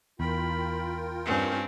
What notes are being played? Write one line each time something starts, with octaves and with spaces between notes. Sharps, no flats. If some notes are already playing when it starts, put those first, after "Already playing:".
E2 F4 A#4 G5 B5
G2 C4 C#4